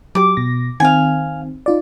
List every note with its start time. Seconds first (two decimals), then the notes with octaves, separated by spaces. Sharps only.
0.15 F#3 G4 D6
0.37 B2 A#6
0.80 D#3 C4 F5 G#5
1.66 D#4 F4 D5